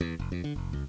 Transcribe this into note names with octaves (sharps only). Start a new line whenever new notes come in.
E2
F1
F2
D3
F1
C#2